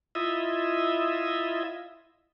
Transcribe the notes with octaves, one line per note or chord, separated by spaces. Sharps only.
E4 F4 D#5 E5